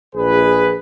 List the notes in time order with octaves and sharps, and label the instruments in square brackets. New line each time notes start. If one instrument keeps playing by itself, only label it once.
[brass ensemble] A#1 G#4 B4